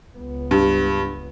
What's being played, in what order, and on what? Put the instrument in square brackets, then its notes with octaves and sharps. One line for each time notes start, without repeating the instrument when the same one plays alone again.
[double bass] C#2 B3
[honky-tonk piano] G2